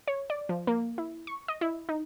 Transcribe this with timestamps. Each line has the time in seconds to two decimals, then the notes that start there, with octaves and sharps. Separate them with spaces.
0.08 C#5
0.30 D5
0.49 F3
0.67 A#3
0.98 E4
1.27 C#6
1.48 D#5
1.61 E4
1.89 D#4